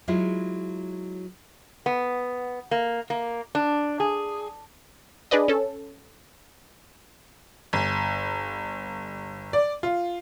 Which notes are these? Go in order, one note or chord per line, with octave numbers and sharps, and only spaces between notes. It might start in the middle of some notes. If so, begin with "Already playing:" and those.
F#3 G#3 E4 F4
B3
A#3
A#3
D4
G#4
D4 G#4 B4 D5 D#5
C#4 A4
G1
D5
F4